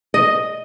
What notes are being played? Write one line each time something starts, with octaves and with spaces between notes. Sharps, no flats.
D#5